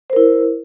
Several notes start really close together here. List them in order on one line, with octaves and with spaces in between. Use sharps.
C5 A#4 E4